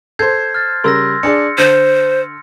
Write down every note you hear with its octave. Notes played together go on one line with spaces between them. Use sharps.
A4 C5 G6 G#6 C7
F6 A6
C#3 G3 A#4 C6 E6 A#6
D4 G#4 D5 C#7
D3 C5